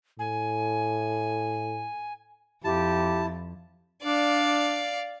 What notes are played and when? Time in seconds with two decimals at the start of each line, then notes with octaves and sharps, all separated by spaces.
0.19 A2 G#5
2.64 F2 E4 G4 A5
4.03 D4 D5 F5